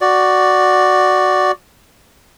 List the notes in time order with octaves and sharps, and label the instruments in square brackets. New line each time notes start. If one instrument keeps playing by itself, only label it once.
[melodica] F#4 D5